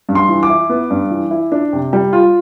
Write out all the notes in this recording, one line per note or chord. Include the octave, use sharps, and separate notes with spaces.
G2
C6
E3
D6
E4
B3
G2
E3
E4
D4
C3
G3
F4